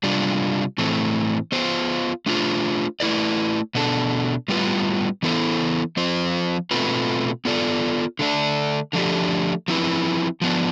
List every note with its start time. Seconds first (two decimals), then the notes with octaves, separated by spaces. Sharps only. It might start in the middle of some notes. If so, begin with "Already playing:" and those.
0.03 C3 G3 D4 F4
0.78 A2 E3 A3 C4
1.52 B3 F4 C5
2.26 A3 D4 F4 C5
3.00 A3 E4 B4 D5
3.75 B2 B3 D4 A4
4.48 A2 G3 B3 F4 B4
5.23 E3 B3 E4 A4 C5
5.97 F3 C4 F4 C5
6.71 B2 A3 C4 F4 B4
7.45 B3 F4 A4 D5
8.19 D3 A3 D4
8.93 D3 F3 A3 D4 G4
9.68 F3 C4 E4 B4
10.41 F3 B3 D4